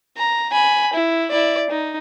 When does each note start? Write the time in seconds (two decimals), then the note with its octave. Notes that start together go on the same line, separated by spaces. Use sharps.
0.17 A#5
0.51 G#5 B5
0.93 E4
1.31 E4 D5
1.70 D#4